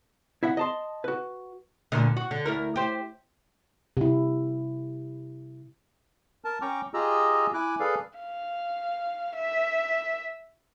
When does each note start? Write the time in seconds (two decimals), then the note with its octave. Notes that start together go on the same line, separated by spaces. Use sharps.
0.43 E4 E5 F#5
0.57 D#5 A5 C6
1.04 F#4 B4
1.92 D2 A#2 D3
2.17 F#4
2.31 D3
2.46 D2 E4 A#4
2.76 G4 C5
3.97 C3 E4
6.45 A#4 A5
6.62 C#4 G5 A#5 C#6 D6
6.94 F4 G4 G#4 D#5 A#5 E6
7.54 E4 G#5 D6 F#6
7.80 G#4 A4 B4 D5 F5
8.19 F5
9.35 E5